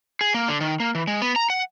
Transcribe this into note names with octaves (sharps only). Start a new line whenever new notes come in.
G#4
A#3
D3
D#3
A#3
E3
G#3
B3
A#5
F#5